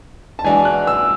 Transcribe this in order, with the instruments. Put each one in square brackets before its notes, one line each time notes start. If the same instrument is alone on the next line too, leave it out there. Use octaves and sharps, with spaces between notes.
[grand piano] A5
[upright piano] E3 G#3 D4 F#4 [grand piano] G#5
[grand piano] F#6
E6